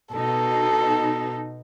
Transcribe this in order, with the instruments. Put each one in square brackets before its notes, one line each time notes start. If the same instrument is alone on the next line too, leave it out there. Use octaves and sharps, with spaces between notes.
[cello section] B2 D#4 [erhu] A4